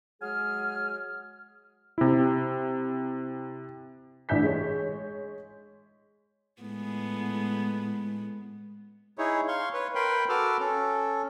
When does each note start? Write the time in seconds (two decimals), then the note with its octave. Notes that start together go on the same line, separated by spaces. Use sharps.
0.22 F#3 G#3 G#4 G#5 F6
1.98 C3 E4
4.29 A1 D4 E5 G6 B6
4.43 G#3 C#5
6.62 A2 G#3 B3
9.18 D#4 E4 G#4 C#5
9.48 F5 C6 C#6
9.74 B4 C#5
9.95 A#4 B4 G5 B5 C6
10.29 F#4 A4 B4 D6 E6 F6
10.60 C#4 A4